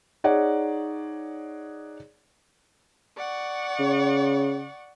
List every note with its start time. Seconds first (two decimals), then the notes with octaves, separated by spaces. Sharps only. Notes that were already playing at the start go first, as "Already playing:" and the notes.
0.24 D#4 G#4 C#5 D5 F#5
3.18 D5 F#5 C#6
3.79 C#3